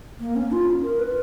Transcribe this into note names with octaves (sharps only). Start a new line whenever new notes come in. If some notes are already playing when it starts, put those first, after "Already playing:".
A#3
C#4
F4
A#4
B4